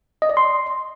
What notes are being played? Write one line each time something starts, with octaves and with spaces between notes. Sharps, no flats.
D#5
D5
C6